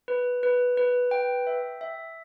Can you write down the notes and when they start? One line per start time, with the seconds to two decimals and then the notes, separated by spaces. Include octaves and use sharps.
0.08 B4
0.43 B4
0.77 B4
1.11 G5
1.47 E5
1.81 E5